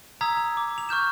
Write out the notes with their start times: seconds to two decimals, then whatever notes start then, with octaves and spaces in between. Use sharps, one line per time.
0.21 A#5 D#6 E6 G#6 B6
0.37 A#5
0.57 D6
0.78 F7
0.89 C#6 F6 G6 E7